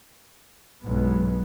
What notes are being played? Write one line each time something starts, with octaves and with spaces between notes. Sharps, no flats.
B1 G2 F#3 G#3 B3